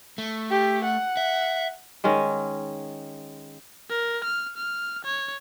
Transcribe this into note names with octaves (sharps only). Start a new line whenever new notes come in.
A3
G4
F#5
E5
D#3 G#3 C#4
A#4
F6
F6
C#5